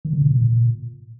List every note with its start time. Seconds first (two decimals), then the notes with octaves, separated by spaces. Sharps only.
0.05 D#3
0.13 D3
0.22 C3
0.30 A#2